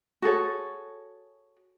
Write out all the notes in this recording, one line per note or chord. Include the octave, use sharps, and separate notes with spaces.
F#4 G#4 A4 C#5